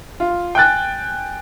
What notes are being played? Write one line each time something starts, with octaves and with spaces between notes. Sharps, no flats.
F4
G5 G#5 F#6 A6